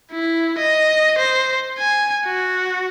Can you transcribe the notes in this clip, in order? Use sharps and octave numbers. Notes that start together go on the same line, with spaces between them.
E4
D#5
C5
G#5
F#4